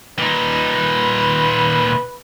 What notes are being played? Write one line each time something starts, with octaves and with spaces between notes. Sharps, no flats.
A#2 D#4 B4